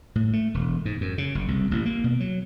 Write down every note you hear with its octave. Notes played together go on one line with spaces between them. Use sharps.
A2
A3
E1
G#2
F#2
C#3
F#1
C2
A1
A#3
B2
F#3